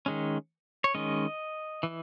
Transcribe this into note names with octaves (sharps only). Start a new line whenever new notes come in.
D#3 G#3 C#4
C#5
D#3 G#3 C#4 D#5
E3